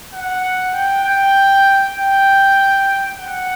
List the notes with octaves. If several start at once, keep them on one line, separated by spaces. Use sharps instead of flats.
F#5
G5
G5
G5
F#5